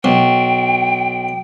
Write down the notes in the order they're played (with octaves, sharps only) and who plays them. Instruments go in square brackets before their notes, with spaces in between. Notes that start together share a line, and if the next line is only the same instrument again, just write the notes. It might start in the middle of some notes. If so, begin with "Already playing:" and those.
[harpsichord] B1 [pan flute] G5